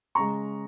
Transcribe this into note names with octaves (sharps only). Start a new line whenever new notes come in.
C#3 G#3 A#5 C#6